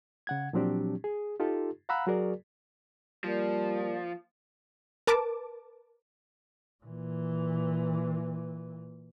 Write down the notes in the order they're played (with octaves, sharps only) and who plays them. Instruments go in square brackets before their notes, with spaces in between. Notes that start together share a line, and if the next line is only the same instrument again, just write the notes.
[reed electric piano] C#3 F#5 G#6
A#2 F3 F#3 C4 D4 G4
G#4
D#4 F4 G4 A4
F5 F#5 A#5 B5 E6 F#6
F#3 F#4 G#4 A#4 D5
[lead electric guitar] F3 [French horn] G3 [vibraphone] A#3 A#4 D5
[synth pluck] A#4 B4 A5 D6
[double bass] A#2 E3